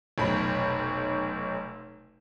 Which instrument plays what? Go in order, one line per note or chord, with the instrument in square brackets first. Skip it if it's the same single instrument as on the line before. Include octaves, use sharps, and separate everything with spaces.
[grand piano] F1 B1 B5